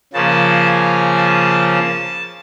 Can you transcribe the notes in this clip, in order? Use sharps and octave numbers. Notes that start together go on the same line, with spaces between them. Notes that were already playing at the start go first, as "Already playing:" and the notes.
C#3 F3 A#3 C#4 A5
G#5
A5
A5